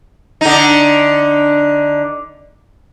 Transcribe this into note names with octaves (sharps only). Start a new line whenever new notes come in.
D3 D#4